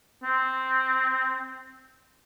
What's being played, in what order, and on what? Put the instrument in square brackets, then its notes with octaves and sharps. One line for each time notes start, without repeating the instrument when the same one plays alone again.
[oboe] C4